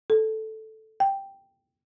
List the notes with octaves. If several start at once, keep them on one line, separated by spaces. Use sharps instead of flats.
A4
G5